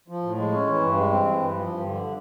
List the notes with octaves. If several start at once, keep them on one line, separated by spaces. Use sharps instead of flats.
F3
A2
G#3
C#4
E3
G2
G#3
C4
E3
G2
F3
G2
D3